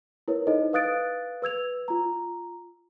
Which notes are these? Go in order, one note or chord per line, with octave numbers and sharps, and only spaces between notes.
E4 A#4 B4 C#5
D#4 E4 A4 C5 D#5
B4 F5 D#6 F#6 A6 D7
B4 E6 G#6 F7
F4 A#5